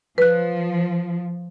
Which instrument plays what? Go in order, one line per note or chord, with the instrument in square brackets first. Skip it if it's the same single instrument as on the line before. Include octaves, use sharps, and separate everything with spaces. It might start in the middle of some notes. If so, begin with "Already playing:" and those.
[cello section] F3 [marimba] B4 F#6